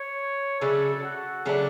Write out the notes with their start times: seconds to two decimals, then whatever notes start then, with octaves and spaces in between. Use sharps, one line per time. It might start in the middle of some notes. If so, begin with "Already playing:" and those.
Already playing: C#5
0.61 C#3 F#3 A3 D4 A4
1.03 F#4
1.45 C#3 F#3 A3 D4